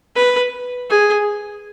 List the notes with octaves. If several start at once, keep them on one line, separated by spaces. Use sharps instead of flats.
B4
G#4